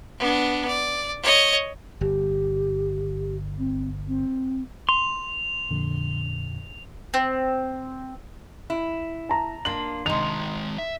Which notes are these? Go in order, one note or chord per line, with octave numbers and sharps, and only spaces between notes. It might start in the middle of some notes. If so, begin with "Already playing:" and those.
B3 D4
D5
C#5 D#5
G1 G4
C4
C4
C6 F7
F2 A#2 D3
C4
E4
A5 A#5
A#3 D4 F4 F#7
C3 D#3 G#3 D#4 F7
E5